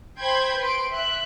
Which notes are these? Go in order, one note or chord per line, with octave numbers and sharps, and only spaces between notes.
C5 G5 B5 C6 G6 G#6
B4 C6 D7
E5 F#6